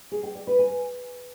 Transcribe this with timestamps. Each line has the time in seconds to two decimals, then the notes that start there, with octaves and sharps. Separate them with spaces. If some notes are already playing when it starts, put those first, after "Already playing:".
0.12 G#4
0.23 G5
0.35 D5
0.47 B4
0.59 G#5